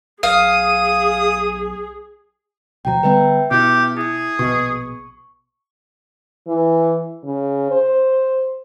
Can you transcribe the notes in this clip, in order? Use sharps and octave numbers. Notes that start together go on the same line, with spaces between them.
B1 G#4 F5 D#6
D1 B2 F3 G5 A#5
D3 G3 B3 B4 E5 G5
B2 B3 E4 G4
E4 G#4 D#6
A#1 B2 C#6
E3
C#3
C5